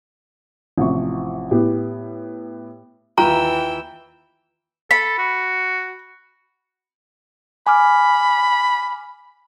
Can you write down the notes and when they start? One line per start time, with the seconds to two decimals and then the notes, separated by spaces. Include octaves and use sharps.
0.78 A1 C3 F3 E4 C#6
1.51 A2 B3 G4
3.18 D#2 E3 F4 G5 A#5 E6
4.91 A4 B5
5.19 F#4
7.67 G#5 B5 D6 F6